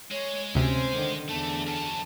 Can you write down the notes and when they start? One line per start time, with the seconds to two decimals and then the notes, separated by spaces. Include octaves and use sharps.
0.11 G#3 C#5
0.55 D2 C3 C4 C#4 C5
0.95 D3 D#3
1.29 E2 D3 A3 A5
1.67 F#2 C#4 A5